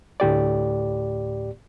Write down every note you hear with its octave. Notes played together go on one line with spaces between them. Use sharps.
D2 A2 G4 D5